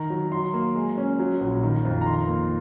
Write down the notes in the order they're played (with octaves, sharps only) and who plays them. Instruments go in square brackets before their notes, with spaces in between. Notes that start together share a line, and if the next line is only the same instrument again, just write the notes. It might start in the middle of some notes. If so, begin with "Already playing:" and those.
Already playing: [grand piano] D#3 A#5
F#3
F#3 C6
A#3
G#3
C#4
F#3
A#1
D#3
F2
A#5
D#3 C6
A#3